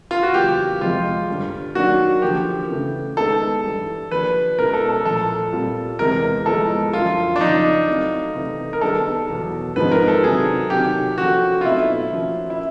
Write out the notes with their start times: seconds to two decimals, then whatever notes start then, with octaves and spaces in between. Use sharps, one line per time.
0.11 F4
0.23 F#4
0.34 E2 C#3 F#3 A#3 G4
0.81 F2 C3 F3 G#3 F4
1.28 G2 D3 G3
1.75 D#3 F#3 A#3 D4 F#4
2.22 D3 F3 A#3 G4
2.70 C#3 E3 A3
3.17 D#3 G#3 B3 A4
3.64 G2 E3 G3
4.11 D3 F3 A#3 D4 G4 B4
4.58 B2 G#3 C#4 E4 A#4
4.73 A4
4.89 A4
5.05 A#2 F3 A3 A4
5.53 A#2 G3 C4 F4
5.99 E2 C3 E3 G#3 C4 A#4
6.46 A2 F3 G#3 B3 A4
6.93 F#2 D3 F3 F4
7.36 D4
7.41 F2 C#3 F3 D#4
7.88 F#3 A3 C4 E4 A4
8.35 C3 E3 A3 C4
8.73 A#4
8.81 D#3 G3 B3 D#4 G#4 A4
9.29 E2 B2 F#3
9.76 G#2 F3 G#3 C4 D#4 B4
9.91 A#4
10.08 A4
10.23 C3 D#3 F#3 G#4
10.70 C3 D#3 F#3 G4
11.18 F3 A#3 C#4 F4 F#4 A4
11.61 F4
11.65 B2 F#3 A3 C4 D#4 E4
12.12 F3 A#3 C#4 F#4
12.50 E4